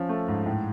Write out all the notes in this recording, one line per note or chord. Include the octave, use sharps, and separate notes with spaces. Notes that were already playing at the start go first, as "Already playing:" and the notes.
Already playing: F3 C#4
A3
G#2
A2